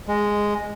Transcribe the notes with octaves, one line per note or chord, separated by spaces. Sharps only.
G#3